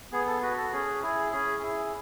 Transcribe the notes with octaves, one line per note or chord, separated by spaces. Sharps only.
B3 G#4
A4
F#4 B4
A4
C#4 G#4
E4 G#4
C#4 G#4
E4 G#4